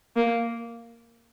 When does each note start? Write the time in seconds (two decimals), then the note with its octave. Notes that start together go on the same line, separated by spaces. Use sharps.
0.16 A#3